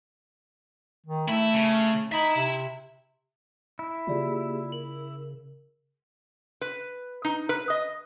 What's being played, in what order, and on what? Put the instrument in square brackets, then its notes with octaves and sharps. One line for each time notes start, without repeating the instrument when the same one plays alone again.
[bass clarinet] D#3
[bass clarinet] A3 [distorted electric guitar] E4
[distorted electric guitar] C#3
[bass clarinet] D#4 [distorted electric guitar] E5 B5
[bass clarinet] C3
[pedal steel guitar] E4
[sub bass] C#3 [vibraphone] A#3 G4 G#4 [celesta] F4 D5
[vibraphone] A#4 [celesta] F#7
[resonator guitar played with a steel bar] B4
D#4
B4
D#5